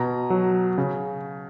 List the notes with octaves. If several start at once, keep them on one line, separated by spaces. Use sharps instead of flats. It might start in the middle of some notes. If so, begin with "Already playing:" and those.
Already playing: B2 A#5
F#3
C#3